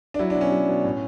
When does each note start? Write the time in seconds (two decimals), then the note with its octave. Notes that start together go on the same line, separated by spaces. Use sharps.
0.14 D4
0.19 F#3 E4
0.30 D4
0.35 B2
0.41 C#4
0.52 F#3
0.68 B2
0.84 A2